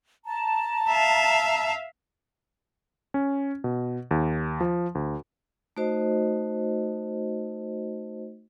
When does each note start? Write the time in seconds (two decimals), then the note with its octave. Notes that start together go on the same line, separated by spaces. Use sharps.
0.25 A5 A#5
0.89 E5 F5
3.14 C#4
3.64 B2
4.11 D#2
4.61 F3
4.95 D2
5.77 A3 D#4 F#4 C5 D#5